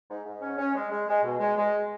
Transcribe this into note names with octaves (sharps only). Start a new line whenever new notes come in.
G#2
G#2
C#4
C#4
G#3
G#3
G#3
B2
G#3
G#3